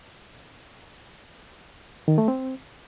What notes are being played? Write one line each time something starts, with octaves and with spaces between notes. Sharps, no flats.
D#3
A3
C4